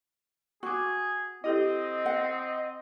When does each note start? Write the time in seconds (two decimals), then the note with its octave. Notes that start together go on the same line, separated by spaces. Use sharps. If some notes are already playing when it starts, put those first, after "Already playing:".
0.63 F#4 G#4 C#6 D6
1.44 C4 E4 G4 A4 D#5
2.06 F#5